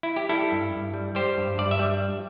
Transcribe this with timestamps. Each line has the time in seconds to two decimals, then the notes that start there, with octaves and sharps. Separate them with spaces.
0.03 E4
0.16 G4
0.29 G3 E4 A4
0.52 G2
0.73 G2
0.94 G3
1.15 G3 G4 C5
1.37 G2
1.58 G2 D5
1.71 E5
1.79 G3